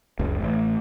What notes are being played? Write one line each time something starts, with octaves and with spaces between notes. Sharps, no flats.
F#1 C#2
A1